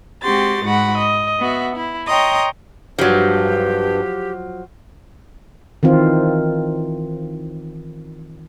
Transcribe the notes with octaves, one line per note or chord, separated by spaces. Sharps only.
G#3 C4 F#4 G4 C6 A6
G#2 G#3 F#4 F#5 B5
D#5
B3 F#4 E5
E4
C#5 D#5 G5 A#5 C6 D#6
G2 F3 F#3 G4
D#3 E3 C4 F4